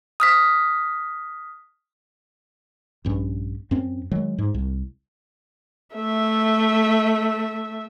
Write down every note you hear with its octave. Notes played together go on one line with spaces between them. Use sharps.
D#6 F6 B6
A#1 G2 C#4
F#2 C4 C#4
D#3 F#3 G#3
G#2
C2
A3 E5